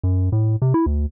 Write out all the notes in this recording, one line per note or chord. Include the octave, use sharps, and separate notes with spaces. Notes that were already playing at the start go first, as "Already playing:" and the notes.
F#2
A2
C3
E4
D2